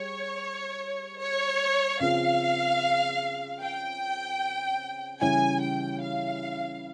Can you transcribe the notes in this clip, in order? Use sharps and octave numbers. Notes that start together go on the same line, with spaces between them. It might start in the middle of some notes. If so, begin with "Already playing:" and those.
Already playing: G3 G#4 C#5
C#5
C#3 F3 C4 F4 G#4 F5
G5
C#3 E3 G3 C#4 E4 G#5
G5
F5